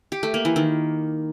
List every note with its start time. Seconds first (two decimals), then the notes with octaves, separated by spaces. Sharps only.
0.12 G4
0.23 A3
0.34 A#3
0.45 E3
0.56 D#3